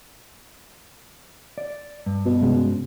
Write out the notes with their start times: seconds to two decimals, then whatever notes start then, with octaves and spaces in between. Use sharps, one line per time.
1.58 D5
2.06 G2
2.26 B2
2.42 C3 G#3 C#4